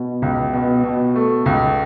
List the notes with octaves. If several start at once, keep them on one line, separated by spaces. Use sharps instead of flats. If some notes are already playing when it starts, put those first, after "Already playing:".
Already playing: B2
C#2
B2
B2
A3
C#2